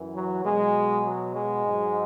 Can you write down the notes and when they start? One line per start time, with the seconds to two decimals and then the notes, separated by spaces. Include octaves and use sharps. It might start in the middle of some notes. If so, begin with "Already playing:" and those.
Already playing: F#2 E3
0.14 F#3
0.44 B2 F#3 G#3
1.06 F#3
1.35 G#3
1.66 G#2 F#3